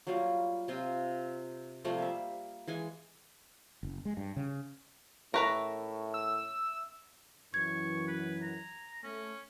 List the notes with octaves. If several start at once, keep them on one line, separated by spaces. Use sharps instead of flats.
F#3 G3 A#3 F4
C3 C4 F4
C3 F3 G3 A3
A#3 E5
E3 G#3 G#5
F#1
G#3
G2
C#3
A2 A#4 B4 E5 A#5 C#6
E6
F#2 E3 C#6 G#6
B4
A#5
A3 C#4